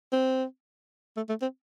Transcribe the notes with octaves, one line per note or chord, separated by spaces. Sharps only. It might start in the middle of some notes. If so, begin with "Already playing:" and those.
C4
A3
A3
C4